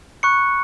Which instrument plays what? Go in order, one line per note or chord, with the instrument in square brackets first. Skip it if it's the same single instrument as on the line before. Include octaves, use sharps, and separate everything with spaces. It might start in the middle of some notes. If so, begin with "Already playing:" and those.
[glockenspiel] B5 C#6 F#6 C#7